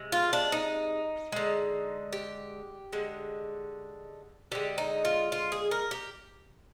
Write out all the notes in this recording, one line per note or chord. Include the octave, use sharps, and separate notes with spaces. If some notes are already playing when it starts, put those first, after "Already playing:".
Already playing: C3 G#3
F4
D4
D#4
D3 G#3
G4
D3 G#3
D3 G#3 G4
D#4
F4
F4
G#4
A#4
G4